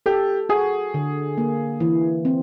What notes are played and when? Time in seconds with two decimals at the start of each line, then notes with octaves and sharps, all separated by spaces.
0.06 G4 A4
0.49 F#4 G#4
0.94 D3
1.38 A#3
1.80 E3
2.25 C4